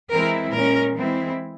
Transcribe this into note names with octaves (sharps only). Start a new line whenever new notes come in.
E3 G#3 C4 E4 A#4
A#2 G#3 C#4 A#4
E3 G#3 C4 E4